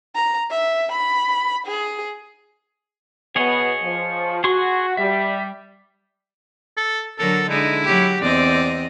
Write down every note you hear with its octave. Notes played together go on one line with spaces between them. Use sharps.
A#5
E5
B5
G#4
B2 B3 G#4 C#5 D#5
F3
F#4 G#4 C6 C#6
G3 E5
A4
D3 F#3 A4 A#4
D3 G#3 D#4 E4
F#3 G4
E2 C4 D5 D#5